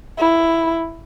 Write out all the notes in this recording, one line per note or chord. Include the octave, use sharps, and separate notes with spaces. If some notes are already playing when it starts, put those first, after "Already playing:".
E4